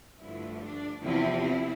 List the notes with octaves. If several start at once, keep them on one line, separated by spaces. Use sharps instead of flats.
G2 D3 F3 A3 E4
D4
E2 C3 F3 C4 E4
E4